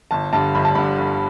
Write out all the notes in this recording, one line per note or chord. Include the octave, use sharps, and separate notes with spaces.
G1 A5
G2 D3 A5
G1 B5
A5
G2 D3 B5
G1